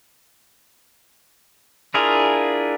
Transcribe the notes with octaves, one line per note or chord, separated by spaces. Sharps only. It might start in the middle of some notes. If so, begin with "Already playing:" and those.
D4 E4 F4 G#4 A#4